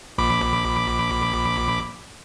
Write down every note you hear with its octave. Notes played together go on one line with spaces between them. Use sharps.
A#1 B5 D6